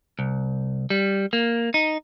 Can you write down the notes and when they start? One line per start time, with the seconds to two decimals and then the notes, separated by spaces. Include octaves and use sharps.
0.19 C2
0.90 G3
1.33 A#3
1.74 D#4